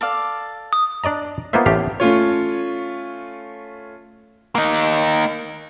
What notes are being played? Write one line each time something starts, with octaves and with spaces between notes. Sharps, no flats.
A4 D5 F5
D#6
D4 D5 D#5 A#5
A#3 B3 D#4 F4 C5 E5
A1 A3 G4 F5
A3 C#4 F4 C#5
A#3 D#4